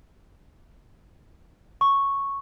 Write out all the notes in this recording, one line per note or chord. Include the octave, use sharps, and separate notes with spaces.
C#6